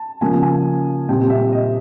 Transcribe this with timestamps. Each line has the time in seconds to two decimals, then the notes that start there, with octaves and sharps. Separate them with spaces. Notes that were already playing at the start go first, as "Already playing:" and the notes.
Already playing: A5
0.21 C#3 F3 A#3 G#5
0.43 G#5
1.09 A#2 G3 C4 G5
1.30 E5
1.52 D#5